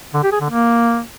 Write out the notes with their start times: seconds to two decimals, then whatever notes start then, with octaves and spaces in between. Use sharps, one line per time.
0.14 D3
0.23 G4
0.32 G#4
0.41 D3
0.50 A#3